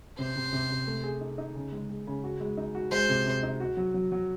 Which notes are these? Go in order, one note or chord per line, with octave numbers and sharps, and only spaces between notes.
C3 C5
C3
C3
C3
A3
G#4
D#4
D#4
C#3
G#3
G#3
C#3
F#4
G#3
D#4
F#4
G#3 C5
C3
C3
D#4
F#4
F#3
F#3
F#3